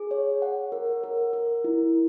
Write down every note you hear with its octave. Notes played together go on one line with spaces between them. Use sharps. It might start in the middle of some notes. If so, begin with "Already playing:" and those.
Already playing: G#4
C#5
F#5
A#4
A#4
A#4
E4